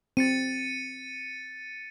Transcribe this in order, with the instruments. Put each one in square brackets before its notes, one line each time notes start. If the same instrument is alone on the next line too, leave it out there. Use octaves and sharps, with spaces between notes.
[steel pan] C4 [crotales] A6 C#7 D#7